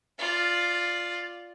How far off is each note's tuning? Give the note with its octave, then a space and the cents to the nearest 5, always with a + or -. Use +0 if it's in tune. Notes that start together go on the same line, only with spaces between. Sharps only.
F4 +0 D5 +0